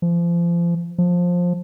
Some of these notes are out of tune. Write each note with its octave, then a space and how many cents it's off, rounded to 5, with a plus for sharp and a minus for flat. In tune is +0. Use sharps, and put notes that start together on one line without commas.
F3 -30
F3 +15